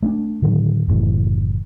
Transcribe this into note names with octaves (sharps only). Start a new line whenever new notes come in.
A3 C#4 D4
A2 D3 D#3 F#3
F#1 A2 E3